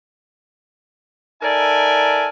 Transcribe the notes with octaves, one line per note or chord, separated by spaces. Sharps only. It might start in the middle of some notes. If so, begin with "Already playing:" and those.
D#4 A4 A#4 D5 E5 G#5